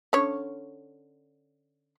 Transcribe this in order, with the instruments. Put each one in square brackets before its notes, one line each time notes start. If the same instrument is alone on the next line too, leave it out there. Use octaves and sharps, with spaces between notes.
[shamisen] D3 C#4 C#5